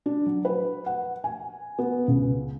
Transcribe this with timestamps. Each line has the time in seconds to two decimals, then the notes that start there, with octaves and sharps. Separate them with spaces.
0.06 D4
0.26 F#3
0.45 B4
0.86 F#5
1.24 G#5
1.79 B3
2.08 C#2